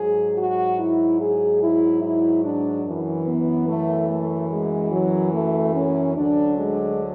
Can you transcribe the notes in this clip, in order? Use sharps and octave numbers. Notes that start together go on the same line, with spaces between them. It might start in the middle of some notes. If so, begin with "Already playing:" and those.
Already playing: G#2 F#3 G#4
F#4
E4
G#4
E4
E4
D4
F#2 E3
B3
A3
A3
G#3
F#3
A3
C#4
D2 D3 F#3 D4
G#3